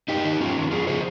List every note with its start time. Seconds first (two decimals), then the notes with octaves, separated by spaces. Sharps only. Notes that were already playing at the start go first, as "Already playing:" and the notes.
0.08 G2 D#4 G4
0.25 D#3
0.40 G2 C#4 F4
0.56 D#3
0.71 F2 F4 G#4
0.87 C#3 F3 G#4 C5